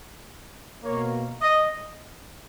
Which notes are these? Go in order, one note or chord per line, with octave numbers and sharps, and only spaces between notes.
B2 A#3 C#5
D#5